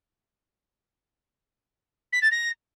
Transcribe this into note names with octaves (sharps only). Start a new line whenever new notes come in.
B6
A6
A#6